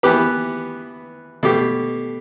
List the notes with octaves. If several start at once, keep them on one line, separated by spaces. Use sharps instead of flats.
E3 B3 G4 B4
B2 A3 G4